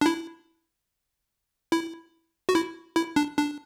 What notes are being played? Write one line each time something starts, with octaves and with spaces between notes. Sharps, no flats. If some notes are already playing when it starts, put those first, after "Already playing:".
D4
E4
E4
F#4
E4
E4
D4
D4